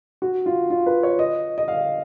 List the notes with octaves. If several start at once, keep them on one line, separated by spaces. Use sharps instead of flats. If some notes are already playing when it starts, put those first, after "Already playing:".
F#4
F4
F4
B4
C#5
D#5
D#5
F5